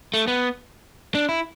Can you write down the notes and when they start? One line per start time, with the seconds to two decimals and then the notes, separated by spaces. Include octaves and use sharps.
0.14 A3
0.28 B3
1.15 D4
1.29 E4